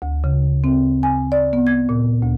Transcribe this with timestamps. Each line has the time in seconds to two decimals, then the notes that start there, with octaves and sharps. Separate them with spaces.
0.02 D2
0.24 C#3
0.64 C4
1.03 G#5
1.32 D5
1.53 B3
1.67 G#6
1.89 A#2
2.22 D2